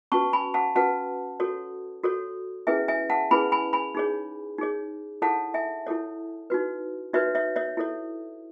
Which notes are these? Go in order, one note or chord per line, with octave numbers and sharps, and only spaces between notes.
C#4 F#4 B4 A5 C#6
G#5 B5
F#5 A5
C#4 F#4 B4 F#5 A5
F#4 A4 C#5
F#4 A4 C#5
C#4 E4 G#4 B4 E5 G#5
E5 G#5
F#5 A5
C#4 E4 G#4 B4 G#5 B5
G#5 B5
G#5 B5
D#4 G#4 C#5
D#4 G#4 C#5
E4 A4 C#5 F#5 A5
E5 G#5
E4 A4 C#5
D#4 F#4 B4
D#4 F#4 B4 C#5 E5
C#5 E5
C#5 E5
E4 A4 C#5